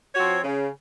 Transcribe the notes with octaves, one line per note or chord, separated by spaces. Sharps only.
F3 C4 F#4 C#5
C#3